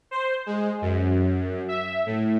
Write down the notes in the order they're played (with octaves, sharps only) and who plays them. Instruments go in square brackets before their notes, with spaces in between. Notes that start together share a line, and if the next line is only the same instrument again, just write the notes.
[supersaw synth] C5
G#3
F#2
E5
A2